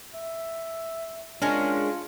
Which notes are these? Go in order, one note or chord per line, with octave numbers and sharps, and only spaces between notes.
E5
G#3 C#4 D4 F4 A#4